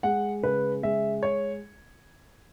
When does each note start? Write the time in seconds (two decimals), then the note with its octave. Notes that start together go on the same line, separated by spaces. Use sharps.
0.03 G#3 F#5
0.43 C#3 B4
0.83 G#3 E5
1.23 C#5